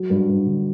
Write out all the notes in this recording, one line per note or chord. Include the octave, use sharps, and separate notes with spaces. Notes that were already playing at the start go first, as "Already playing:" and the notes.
Already playing: F#3
G2
G2
D3